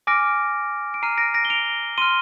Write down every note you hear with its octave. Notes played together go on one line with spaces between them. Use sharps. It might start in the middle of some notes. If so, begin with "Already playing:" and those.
G#5 D6 F6 A#6 D7
D7
A#5 F6 C7 D#7
A#6 D7
A#6 D7
G7
D7 F7
C6 F6 D#7 G7